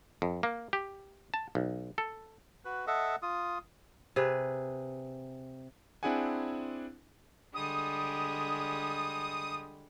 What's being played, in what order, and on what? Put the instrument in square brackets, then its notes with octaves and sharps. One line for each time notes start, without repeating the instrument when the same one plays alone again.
[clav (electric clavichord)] F2
A#3
G4
A5
B1
A4
[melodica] F#4 B4
A4 D#5 E5 F#5
F4 D#6
[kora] C3 G#4 B4
[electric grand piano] C4 D4 E4 G#4 F#5 G#5
[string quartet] D3 G3 G#3 [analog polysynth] D#6